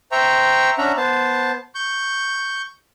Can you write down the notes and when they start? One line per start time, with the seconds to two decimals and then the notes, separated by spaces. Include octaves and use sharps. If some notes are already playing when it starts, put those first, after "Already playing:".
0.12 C5 E5 G5 A#5 C#6
0.78 C#4 D4 E5 F#5 A#5
0.97 B3 C5 A5
1.75 C#6 G6